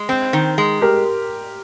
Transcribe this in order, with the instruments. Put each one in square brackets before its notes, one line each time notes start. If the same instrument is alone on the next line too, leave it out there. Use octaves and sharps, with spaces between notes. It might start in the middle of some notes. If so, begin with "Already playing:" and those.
Already playing: [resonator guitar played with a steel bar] G#3
C4
D#3
G#3
[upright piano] G4 A#4